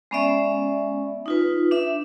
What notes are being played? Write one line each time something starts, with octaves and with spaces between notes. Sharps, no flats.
G#3 B3 C#4 D5 E5
D#4 F4 B4
D4 E5